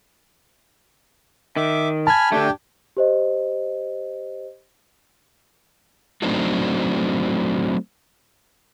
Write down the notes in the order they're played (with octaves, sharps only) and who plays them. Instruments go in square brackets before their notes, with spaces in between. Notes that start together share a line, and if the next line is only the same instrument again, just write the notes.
[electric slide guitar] D#3 [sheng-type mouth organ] E5 D6
[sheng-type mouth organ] G#5 B5 F6 [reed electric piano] A5 G#6
[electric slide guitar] D3 A3 [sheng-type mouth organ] D4 G4 G5
[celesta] G4 C5 D#5
[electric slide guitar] F#3 A3 C4 D4 D#4 F#4